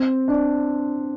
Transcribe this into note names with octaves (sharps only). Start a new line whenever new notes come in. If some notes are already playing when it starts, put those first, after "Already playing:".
Already playing: C4
D4